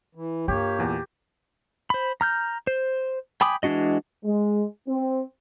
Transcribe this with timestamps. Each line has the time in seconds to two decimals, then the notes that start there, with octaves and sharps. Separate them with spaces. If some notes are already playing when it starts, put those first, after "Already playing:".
0.15 E3
0.48 G2 A#3 F4 G4 C#5
0.79 E2 A#2
1.90 C5 B5
2.21 A#5 F6 G6
2.67 C5
3.41 G5 G#5 B5 D6 D#6
3.63 E3 G#3 D4 F#4 D#5
4.24 G#3
4.87 C4